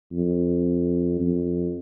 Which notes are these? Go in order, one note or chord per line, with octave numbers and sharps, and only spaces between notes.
F2
F2